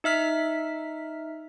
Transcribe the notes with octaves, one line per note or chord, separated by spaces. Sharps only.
D#4 E5 F6 B6